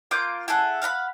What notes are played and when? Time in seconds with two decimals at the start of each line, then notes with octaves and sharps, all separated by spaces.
0.11 A#3 F4 D6 G6
0.48 E4 G#4 A4 F#5
0.82 F5 F#5 A#5 B5